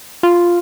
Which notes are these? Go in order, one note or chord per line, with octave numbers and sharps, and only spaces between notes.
F4